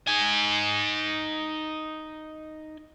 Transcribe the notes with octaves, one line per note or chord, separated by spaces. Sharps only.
D#4 G#5